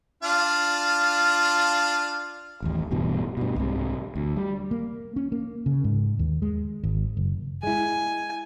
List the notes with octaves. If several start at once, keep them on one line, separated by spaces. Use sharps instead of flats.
D4 F4 F5
A1 D#2
D1 G2 B2 E3
G2 B2
C2 G#2 C3
D2
G3
A#3
C#4
A#3
C#3
G#2
D#2
G#3
G#1
F#1
G#3 E4 G#5